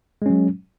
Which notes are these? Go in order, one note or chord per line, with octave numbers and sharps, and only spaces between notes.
F#3 G#3 C#4